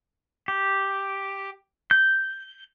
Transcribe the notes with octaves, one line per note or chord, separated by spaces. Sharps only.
G4
G6